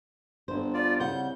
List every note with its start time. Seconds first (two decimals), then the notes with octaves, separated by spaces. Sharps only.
0.48 G1 C5
0.74 F4 D5
1.00 C2 C#3 F#5 G6